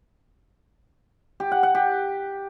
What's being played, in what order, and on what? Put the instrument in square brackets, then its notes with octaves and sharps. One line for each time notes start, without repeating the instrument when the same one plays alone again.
[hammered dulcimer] G4
F#5
F#5
G4